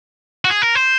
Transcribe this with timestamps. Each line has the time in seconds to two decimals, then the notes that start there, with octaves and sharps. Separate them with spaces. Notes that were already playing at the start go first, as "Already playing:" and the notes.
0.45 F#4
0.50 G#4
0.62 A#4
0.75 C5